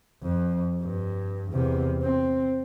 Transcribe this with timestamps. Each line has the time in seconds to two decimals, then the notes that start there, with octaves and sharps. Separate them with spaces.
0.23 F2
0.82 G2
1.51 E2 C3
2.03 C4